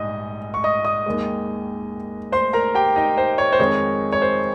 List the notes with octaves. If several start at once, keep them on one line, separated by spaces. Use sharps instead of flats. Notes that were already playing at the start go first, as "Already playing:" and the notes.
Already playing: A#1 G#2 G3 D#5 D#6
C#6
D#5 D#6
D#5 D#6
D#2 D#3 G#3
C5 C6
A#4 A#5
G4 G5
D#4 D#5
C5
C#5
C5
F2 D#3 G#3 C#5
C#5
C5